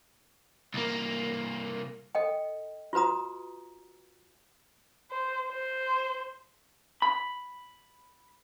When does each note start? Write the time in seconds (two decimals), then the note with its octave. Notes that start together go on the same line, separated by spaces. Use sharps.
0.74 C2 A#3
2.15 A4 D#5 G5
2.93 F4 F#4 B4 A#5 D#6
5.11 C5
5.50 C5
7.02 B5